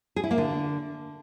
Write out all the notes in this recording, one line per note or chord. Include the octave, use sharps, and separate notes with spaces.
G#4
E4
A#3
D3